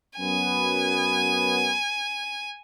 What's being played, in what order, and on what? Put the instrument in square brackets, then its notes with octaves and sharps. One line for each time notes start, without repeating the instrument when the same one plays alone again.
[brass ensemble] F#2 B3 [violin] G#5